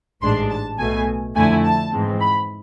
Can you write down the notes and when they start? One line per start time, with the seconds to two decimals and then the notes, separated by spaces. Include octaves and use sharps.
0.22 A1 G#2 G#3 D4 C6
0.50 A5
0.78 B1 B2 A3 G#5
1.35 F2 D3 A3 E4 G#5
1.64 A5
1.92 G#2 E3 G#3 C4
2.20 B5